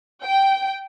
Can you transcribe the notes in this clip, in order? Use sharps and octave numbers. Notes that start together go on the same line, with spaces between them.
G5